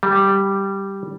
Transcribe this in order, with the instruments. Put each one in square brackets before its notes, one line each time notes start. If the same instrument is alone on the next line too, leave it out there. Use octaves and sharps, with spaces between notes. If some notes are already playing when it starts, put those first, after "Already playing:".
[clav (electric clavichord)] G3